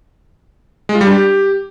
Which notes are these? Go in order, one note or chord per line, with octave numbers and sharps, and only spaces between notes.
G#3
F4
G3
D4
G4